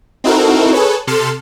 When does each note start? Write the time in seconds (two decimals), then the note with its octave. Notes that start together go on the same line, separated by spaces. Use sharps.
0.24 C4 D#4 E4 F#4 A4 A#4
0.73 G#4 A4 B4 C#5
1.07 C3 A4 C6 F6